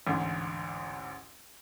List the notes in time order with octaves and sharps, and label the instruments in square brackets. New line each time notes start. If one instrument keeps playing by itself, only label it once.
[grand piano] A1 D2 G#2